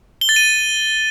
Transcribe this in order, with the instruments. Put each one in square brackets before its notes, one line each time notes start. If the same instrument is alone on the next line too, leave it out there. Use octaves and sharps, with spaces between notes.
[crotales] G7
A6
D#7